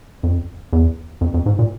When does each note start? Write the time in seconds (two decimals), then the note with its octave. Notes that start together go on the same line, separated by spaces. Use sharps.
0.23 F2
0.73 E2
1.21 F2
1.34 F2
1.46 G#2
1.59 A#2